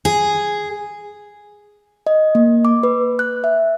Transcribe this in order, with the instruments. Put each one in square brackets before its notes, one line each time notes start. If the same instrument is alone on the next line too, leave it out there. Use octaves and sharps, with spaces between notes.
[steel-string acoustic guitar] G#4
[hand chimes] D#5
A#3
D6
B4
F#6
E5